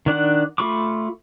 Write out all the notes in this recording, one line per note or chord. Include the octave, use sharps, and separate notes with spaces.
D#3 D4 D5 F#5
A3 F4 B5 C#6 D6